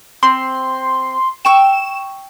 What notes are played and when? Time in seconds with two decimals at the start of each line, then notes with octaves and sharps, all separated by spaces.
0.23 C4 C6
1.45 G5 C#6 E6 E7